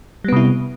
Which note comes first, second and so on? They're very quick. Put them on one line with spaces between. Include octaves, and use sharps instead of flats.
G3 B3 C3 E4